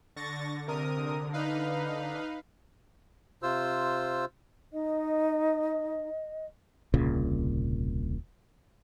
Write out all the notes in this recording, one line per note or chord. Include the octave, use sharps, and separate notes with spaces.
D3 C#6 A6 A#6
C3 A#4 D#6
D#4 B4 F5
C3 F4 C5 E6
D#4 D#5
D#1 C2 A#2 C#3